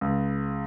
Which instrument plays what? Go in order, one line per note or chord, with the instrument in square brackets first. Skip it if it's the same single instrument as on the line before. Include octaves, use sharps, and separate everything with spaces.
[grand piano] C#2